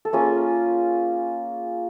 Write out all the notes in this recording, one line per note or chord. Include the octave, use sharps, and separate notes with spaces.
A4
A#3 C#4 F4 G#4